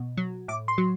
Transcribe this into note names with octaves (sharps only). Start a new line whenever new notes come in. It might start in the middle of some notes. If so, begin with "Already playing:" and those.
Already playing: B2
F#3
A2 D6
C6
F#3